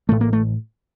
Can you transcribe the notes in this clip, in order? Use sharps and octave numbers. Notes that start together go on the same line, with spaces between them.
A1 A2 A3
A#3
A3